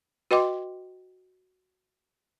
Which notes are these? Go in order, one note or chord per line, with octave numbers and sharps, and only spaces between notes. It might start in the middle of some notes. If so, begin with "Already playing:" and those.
F#4 B4 D#5 G5 C6 D6